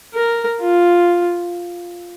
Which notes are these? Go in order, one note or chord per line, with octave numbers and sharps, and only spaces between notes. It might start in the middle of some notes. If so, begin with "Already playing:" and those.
A#4
F4